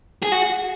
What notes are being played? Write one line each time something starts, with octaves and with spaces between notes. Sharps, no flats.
G#4
F#4